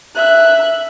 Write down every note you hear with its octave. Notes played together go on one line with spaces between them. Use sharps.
E5 F#6